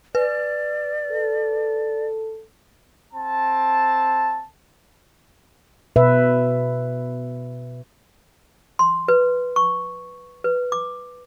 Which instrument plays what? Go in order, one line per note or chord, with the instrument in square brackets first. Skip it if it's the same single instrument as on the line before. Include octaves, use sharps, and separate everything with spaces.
[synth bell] B4 [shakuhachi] D5
[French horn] A4
[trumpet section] C4 A5
[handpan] B2 B4 E5
[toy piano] C6
B4
C#6
B4
D6